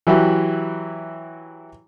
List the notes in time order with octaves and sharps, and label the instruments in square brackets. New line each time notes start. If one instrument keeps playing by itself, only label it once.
[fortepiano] E3 F#3 E4 F#4 G4